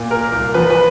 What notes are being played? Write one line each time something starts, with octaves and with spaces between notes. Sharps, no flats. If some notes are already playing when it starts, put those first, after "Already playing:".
Already playing: A#2
A#3 A#4
C2
F3 B4
B4